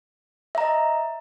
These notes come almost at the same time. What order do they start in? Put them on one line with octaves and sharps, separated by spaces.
E5 A#5 D#5